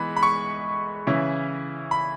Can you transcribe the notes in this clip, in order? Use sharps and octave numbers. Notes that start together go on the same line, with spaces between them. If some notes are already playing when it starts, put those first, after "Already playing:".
Already playing: E3 G#3 B3 B5
B5
C#6
C#3 E3 C#4 E4
B5